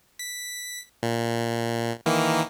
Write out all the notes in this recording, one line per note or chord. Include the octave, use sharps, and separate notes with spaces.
B6
A#2
D#3 E3 A#3